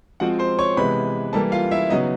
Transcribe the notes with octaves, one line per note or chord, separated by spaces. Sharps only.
F3 G#3 C4 F4 F#4 F#5
C5 C6
C#5 C#6
C3 E3 G#3 B3 B4 B5
E3 G3 A#3 A4 A5
F4 F5
E4 E5
C#3 F#3 B3 D#4 D#5